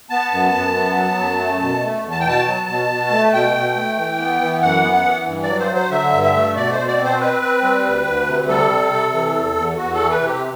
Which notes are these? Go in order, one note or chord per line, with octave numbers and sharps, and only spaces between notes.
B3 A5
F#2
F#2
B3
F#3
F#2
A3
B2
A3
E2
A5
G5
B2 A5
F#3
B2
B2
A3
B2 G5
B2
A3
E3
B3
E3
F#2 F#5
B3
F#5
E3
G2
D5
F#3
C5
F#3
C5
D3 E5
G2
E5
A3
B2 D5
C5
B2
D5
C4
C5
C4 B4
C4
G3
D2
D2
C3
G3 A4
C3
C3
E3
E2
E2
E2 F#4
A4
E3
B4
C3
G4